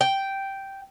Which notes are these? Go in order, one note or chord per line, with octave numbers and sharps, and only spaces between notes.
G5